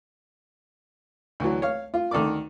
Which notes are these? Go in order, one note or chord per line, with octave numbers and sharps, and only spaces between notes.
D2 E3 F#3
C#5 F5
F4
D2 D#3 A4 D5 D6